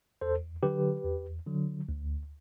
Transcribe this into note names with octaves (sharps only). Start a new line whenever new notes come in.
E2 A4 C5
D3 F#3 G4 B4
E2
D3 F#3
D2